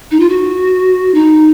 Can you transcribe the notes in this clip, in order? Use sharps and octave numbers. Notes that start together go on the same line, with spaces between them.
D#4
F4
F#4
D#4